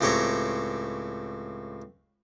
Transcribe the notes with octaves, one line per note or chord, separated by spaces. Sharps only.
C#2 A2 C4 G4 C#5 A#5